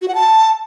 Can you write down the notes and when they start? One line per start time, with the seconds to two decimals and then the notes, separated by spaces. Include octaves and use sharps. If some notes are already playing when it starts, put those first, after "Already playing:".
0.02 F#4
0.08 F#5
0.15 A5